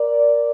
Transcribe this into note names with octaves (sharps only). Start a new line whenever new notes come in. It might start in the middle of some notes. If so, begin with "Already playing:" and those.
Already playing: A#4 D5